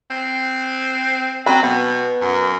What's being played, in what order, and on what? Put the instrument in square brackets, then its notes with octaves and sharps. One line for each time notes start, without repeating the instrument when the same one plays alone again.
[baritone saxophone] C4
[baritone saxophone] F#3 [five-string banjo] C4 B5
[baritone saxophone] B2 [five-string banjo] B3
[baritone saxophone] F#2